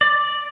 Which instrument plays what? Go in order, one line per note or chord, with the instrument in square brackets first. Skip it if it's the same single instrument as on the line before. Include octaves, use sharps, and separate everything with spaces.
[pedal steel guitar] D5